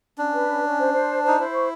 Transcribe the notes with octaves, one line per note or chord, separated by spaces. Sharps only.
C#4 D4
B4
C#4
C#4
C5
C5
A5
D#4 C5
E4 C5
C#6